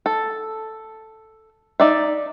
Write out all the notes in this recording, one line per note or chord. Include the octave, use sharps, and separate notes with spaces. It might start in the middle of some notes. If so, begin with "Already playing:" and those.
A4
D#4 D5 E5